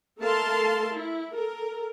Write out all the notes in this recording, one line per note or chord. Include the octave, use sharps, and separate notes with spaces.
A3 A4 A#4 F5 A5 C6
E4
A4 A#4